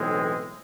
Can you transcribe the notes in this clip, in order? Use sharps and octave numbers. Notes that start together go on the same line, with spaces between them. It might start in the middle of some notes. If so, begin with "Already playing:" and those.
Already playing: B1 A2 E3 G#3 C4